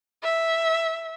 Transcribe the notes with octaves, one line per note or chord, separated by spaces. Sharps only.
E5